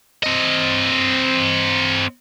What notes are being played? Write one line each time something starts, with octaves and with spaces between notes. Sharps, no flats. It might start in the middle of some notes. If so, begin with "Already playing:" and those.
C4 D#5